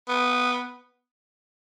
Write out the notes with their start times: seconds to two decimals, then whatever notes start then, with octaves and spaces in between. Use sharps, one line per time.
0.08 B3